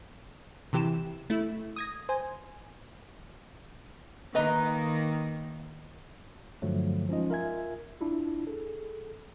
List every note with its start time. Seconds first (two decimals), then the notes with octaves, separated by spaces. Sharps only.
0.73 C3 E3 G4 E7
1.30 A3 E4
1.76 D#6 G#6 A#6
2.09 C5 G#5
4.35 D#3 A#3 B4 D#5 A#5
6.62 G2 D3 F3 F#3 A3
7.08 F3 G#3 C#4 D#4 F4 D#5
7.30 F4 A#4 E5 G#5 G#6
8.01 D4 E4 F4
8.47 G#4 A4